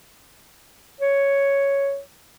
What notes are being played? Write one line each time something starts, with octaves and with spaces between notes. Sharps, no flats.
C#5